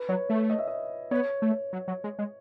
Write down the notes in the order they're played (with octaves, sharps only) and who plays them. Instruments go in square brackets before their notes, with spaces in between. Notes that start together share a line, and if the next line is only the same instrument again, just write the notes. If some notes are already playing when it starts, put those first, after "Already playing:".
Already playing: [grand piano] B4
[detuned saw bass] F#3 [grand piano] C#5
[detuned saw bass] A3 [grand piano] C#5
[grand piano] D#5
E5
D#5
[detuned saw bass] B3 [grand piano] C#5
[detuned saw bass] A3
[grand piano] C#5
[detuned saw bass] F#3
F#3
G#3
G#3